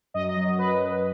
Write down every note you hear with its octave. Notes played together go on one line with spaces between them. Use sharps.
F#2 D#5
D#5
F#3
D#5
F#3 B4
F#2